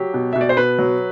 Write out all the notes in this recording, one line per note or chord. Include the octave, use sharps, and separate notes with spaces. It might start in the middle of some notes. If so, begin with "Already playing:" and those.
Already playing: F#3 G4
B2
B2 E5
D5
C5
B2 B4
F#3